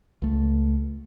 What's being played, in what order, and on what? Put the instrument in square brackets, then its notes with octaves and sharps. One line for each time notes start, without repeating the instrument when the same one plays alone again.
[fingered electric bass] C#2 A3